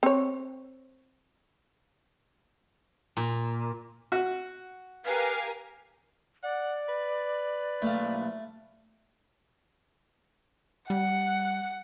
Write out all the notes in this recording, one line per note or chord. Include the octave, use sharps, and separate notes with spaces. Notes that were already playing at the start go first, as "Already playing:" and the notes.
C4 C#5
A#2
F#4
G4 A#4 B4 F5 G#5
D5 F#5
B4
B1 A3 A#3 F5
G3 F#5